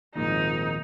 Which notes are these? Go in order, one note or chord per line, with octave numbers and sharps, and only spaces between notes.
G#1 D#2 A#2 F3 D#4